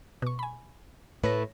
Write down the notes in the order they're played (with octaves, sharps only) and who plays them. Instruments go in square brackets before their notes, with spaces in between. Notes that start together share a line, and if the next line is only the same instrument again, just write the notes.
[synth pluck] B2 C#6
G#5 B5
[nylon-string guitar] A2 A3 B4 [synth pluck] C#5 A#6